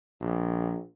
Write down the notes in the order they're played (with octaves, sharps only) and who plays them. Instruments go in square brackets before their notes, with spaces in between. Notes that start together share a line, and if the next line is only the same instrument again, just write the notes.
[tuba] A#1